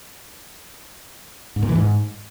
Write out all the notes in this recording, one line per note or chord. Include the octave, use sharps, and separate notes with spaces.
G#2
A#2
E3
G#2